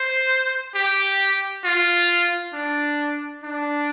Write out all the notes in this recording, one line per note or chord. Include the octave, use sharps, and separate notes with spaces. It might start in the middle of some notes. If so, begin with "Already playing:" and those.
Already playing: C5
G4
F4
D4
D4